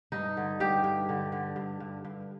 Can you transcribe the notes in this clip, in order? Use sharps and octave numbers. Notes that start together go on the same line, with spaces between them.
G2 D#4
D3
G2 G4
G2
D3
D3
G2
G2
G2